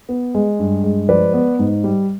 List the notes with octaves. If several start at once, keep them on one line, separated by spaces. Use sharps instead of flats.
B3
G#3
G2
G#3
F3 B4 D5
B3
G#2
G3